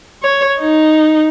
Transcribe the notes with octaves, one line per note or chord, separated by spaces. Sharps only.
C#5
D#4